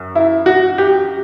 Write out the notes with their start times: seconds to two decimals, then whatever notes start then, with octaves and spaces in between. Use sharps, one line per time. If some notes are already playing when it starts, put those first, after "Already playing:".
Already playing: F#2
0.15 E4
0.46 F#4
0.78 G4